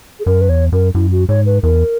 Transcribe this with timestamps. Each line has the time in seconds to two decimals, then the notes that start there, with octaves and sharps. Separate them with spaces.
0.20 G#4
0.26 F#2 A#4
0.41 B4
0.49 E2 C#5
0.72 F#2 A#4
0.94 F#2 E4
1.12 F#4
1.29 G#2 C#5
1.46 B4
1.63 E2 A#4